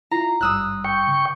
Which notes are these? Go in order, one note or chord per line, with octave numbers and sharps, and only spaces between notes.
E4 F4 A#5
G#1 G2 G3 D#6 E6 F#6
G5 C#6
C#3